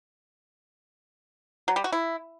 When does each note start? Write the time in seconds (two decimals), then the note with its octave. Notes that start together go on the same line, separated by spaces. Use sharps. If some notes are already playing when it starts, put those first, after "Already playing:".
1.68 F#3
1.76 G3
1.84 F#4
1.92 E4